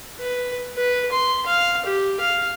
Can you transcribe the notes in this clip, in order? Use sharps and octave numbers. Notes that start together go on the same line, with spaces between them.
B4
B4
C6
F5
G4
F5